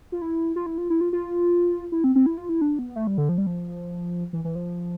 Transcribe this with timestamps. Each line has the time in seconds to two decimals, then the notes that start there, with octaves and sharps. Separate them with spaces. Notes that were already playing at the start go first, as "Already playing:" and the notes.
0.12 F4
0.22 E4
0.56 F4
0.66 E4
0.78 F4
0.90 E4
1.01 F4
1.13 F4
1.92 E4
2.04 C4
2.16 C4
2.26 E4
2.38 F4
2.49 E4
2.61 D4
2.79 B3
2.96 A3
3.07 G3
3.18 D3
3.29 F3
3.38 G3
3.47 F3
4.33 E3
4.45 E3
4.55 F3